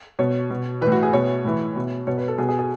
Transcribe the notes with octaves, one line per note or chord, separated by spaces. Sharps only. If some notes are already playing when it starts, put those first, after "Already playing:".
B2 C#5
B2
E3 B4
A2
F#4
G#4
B2 C#5
A2 E3
B2
B2 C#5
B4
A4
B2 G#4
G#4
G#4